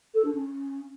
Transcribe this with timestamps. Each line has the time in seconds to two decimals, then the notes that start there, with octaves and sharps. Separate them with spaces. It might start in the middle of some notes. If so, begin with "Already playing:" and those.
0.14 A4
0.24 D4
0.34 C#4